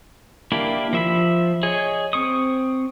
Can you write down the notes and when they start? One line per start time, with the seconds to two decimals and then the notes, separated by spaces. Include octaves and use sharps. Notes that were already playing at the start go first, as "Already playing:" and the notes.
0.52 A#3 D4 E4 G4
0.93 F3 E5 B5
1.63 G#4 C#5 D#5
2.13 C4 C#6 D#6